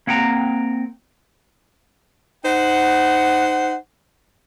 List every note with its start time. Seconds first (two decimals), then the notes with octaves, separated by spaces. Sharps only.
0.07 A#3 C4 F#5 G5 A#5
2.44 D#4 C5 F#5